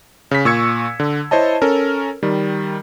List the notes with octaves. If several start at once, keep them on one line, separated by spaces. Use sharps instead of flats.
C#3 B6
A#2 C#6 E6 G#6 C#7
D3
E4 C5 C#5 D#5 A5
C#4 A4 A#4
D#3 G3